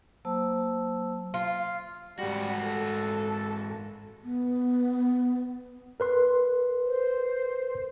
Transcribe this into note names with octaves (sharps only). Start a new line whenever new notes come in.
F#3 A#3 C5 A5 E6
F4
G#2 G3 F#4
A4
B3
A#4 B4 C6
C5